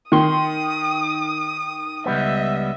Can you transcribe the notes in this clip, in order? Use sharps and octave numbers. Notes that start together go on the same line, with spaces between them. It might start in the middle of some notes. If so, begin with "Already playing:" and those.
D#3 C6 D#6
C#2 G3 B3 D#5 E5